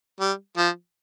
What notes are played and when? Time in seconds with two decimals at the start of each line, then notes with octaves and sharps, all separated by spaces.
0.20 G3
0.57 F3